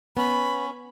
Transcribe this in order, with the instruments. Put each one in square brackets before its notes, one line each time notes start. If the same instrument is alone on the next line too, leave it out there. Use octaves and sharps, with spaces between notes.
[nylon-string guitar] B3 [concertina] C#4 [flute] B5